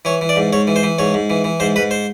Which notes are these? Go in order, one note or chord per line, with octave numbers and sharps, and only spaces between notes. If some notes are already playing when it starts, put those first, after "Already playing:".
E3 C#5
E3
D5
G#2
G#2 C#5
E3
C5
E3
G#2 C#5
G#2
E3
E3
G#2 C5
G#2 B4
C5